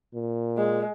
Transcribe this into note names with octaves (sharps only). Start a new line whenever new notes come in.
A#2
G#3